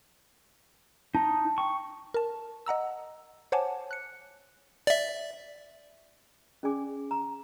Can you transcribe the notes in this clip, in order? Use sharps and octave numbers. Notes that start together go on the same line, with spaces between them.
D#4 A5
G5 C#6
A#4 A5
D#5 F#5 A#5 E6
C5 C#5 F#5 G#5 A5 D6
F#6 C#7
D5 E5
C#4 G#4 D5 G#5 D6
A#5